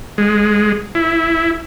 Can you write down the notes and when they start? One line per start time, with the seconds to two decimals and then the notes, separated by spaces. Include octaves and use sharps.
0.18 G#3
0.95 E4